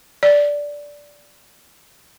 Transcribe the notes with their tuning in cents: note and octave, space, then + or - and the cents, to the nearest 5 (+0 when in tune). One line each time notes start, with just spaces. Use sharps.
D5 -10